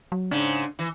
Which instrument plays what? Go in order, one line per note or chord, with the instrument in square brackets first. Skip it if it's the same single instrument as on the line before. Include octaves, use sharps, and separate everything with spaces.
[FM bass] F#3
[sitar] G#2 C#3 [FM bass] D4
[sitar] E3